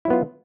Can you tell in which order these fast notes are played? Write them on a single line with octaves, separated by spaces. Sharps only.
E4 F#3 B3 F4